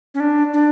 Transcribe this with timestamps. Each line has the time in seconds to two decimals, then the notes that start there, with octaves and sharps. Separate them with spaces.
0.14 C#4
0.20 D4
0.53 D4